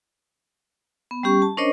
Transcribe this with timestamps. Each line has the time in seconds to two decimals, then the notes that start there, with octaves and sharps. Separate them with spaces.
1.11 B3
1.23 G3 C#4 G4 C#6
1.42 A5
1.57 C#4 D4 A#4 C5 C#5 D#5